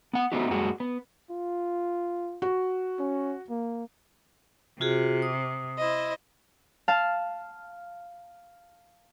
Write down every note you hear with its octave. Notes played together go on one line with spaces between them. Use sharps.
B3 F#5
A3 B3 D#4 F#4 G4
F#2 G3 G#3 A#3 F#4
B3
F4
F#4
C#4
A#3
C3 F4 F#4 G#4
D#6
E4 C5 D#5
F5 A5